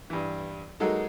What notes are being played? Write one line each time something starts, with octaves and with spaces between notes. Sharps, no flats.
G2 E3
F#3 G#3 A#3 D#4 A4